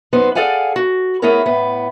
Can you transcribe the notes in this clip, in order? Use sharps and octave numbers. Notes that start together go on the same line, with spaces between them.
F#2 B3 D#4 C5
G#4 A4 D5 F5 F#5 G#5
F#4
A3 B3 E4 G#4 A#4 C#5
A2 B3